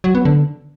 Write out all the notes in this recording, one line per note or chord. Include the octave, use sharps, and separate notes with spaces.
F#3
B3
D3